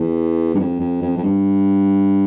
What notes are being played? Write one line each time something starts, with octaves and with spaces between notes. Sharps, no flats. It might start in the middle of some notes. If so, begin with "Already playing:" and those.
Already playing: E2
G2
F2
F2
F2
F2
G2